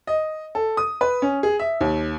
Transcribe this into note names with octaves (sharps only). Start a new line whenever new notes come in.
D#5
A4
D#6
B4
C#4
G#4
E5
D#2